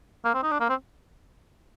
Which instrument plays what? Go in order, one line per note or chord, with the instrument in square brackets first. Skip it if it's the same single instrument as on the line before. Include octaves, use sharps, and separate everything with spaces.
[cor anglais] A#3
C4
D#4
D4
A#3
C4